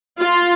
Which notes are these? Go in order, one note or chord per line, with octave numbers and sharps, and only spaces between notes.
F4